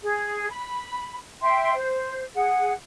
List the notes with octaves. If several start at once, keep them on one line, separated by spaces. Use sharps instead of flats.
G#4
B5
E5 G5 C6
C5
G#4 F#5